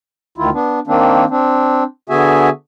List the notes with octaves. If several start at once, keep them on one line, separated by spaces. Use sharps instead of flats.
D2 D#3 E4 F4
B3 D4
D#3 A#3 C4 D4
C4 D4
D3 B3 F#4 G#4 E5 G#5